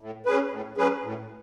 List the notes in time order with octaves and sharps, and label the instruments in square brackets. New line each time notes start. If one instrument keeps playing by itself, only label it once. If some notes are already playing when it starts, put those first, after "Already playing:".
[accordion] A2
F#3 C#4 G#4 B4
A2
F#3 C#4 G#4 B4
A2